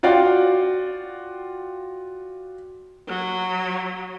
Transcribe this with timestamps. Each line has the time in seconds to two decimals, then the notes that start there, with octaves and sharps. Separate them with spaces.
0.03 F4 F#4 D5 F5 G5
3.08 F#3